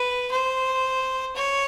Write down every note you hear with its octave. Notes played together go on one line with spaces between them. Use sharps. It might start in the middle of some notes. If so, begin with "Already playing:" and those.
Already playing: B4
C5
C#5